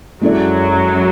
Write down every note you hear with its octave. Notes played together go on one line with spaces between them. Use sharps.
F#2 F#3 G#3 C#4 E4 A4 D5